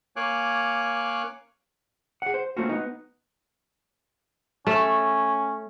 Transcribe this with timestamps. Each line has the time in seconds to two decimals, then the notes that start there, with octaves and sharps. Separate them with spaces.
0.16 A#3 C#5 F5 G#5 D6 F#6
2.22 G#4 F#5
2.34 C5
2.57 A3 A#3 C4 C#4 F4 F#4
2.69 B3 D#4
4.67 A3 C#4